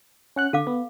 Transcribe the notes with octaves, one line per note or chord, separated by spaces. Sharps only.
C#4 F#5 F#6
D3 A4 F5 D6
B3